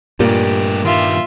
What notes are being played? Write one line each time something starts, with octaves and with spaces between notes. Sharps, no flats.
G2 A#2 A3 A#3 G4
D#3 G3 F4 E5